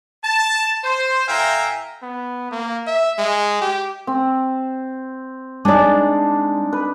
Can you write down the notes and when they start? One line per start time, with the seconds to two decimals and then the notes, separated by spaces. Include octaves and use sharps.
0.24 A5
0.84 C5
1.28 A2 E5 F5 G5 G#5 A#5
2.02 B3
2.51 A#3
2.87 E5
3.18 G#3
3.62 G4
4.07 C4
5.65 G#3 D4 D#4 D5
6.73 B4